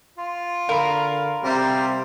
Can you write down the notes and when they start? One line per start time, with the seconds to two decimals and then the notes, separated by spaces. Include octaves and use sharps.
0.18 F4
0.69 D3 A#4 F5 B5
1.44 C3 G3 C5 A#5